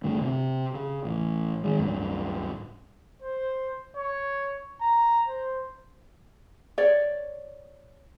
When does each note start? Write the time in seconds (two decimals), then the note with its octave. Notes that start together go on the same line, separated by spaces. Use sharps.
0.04 G2 D3 A3
0.21 C3
0.75 C#3
1.05 A1
1.64 D#3 G#3
1.79 D1 B1 G2
3.22 C5
3.96 C#5
4.81 A#5
5.27 C5
6.78 C#5 D5